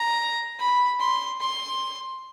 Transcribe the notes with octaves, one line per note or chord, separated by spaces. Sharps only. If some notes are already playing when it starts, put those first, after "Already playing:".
Already playing: A#5
B5
C6
C6